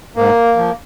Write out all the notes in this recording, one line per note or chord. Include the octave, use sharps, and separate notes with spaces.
G#2 A#3
F3